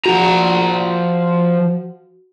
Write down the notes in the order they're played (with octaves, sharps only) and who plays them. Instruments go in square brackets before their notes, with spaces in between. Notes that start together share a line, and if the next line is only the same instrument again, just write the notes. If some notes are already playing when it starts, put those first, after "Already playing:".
[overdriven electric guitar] F3 A#5 [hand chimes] F#4